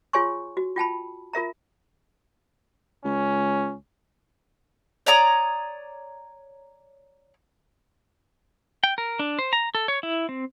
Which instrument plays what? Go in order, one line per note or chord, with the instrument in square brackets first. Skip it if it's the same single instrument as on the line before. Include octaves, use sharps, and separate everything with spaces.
[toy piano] F4 G#4 C#5 G#5 C6 C#6
F#4
F4 G5 A5 B5
F4 A#4 E5 A#5
[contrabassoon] C#2 [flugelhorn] C#4
[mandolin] C#5 D5 A#5 D#6
[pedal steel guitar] G5
A#4
D4
C5
A#5
A4
C#5
E4
C4